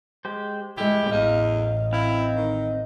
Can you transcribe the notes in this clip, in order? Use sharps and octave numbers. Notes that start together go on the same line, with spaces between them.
G#3 G4 C5
G#3 E4 G4
A1 E2 D#5 F5
C4 E4 F5
D#3